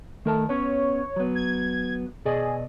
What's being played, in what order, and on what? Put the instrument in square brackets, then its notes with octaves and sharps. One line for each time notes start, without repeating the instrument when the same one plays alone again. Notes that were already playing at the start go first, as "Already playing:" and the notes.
[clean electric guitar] D#3 A#4 A5 [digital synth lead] A3
[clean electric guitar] B3 C#4 [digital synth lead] C#5
[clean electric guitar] F#3 B3
[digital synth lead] G#6
[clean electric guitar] B2 D5 D#5 [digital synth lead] G#4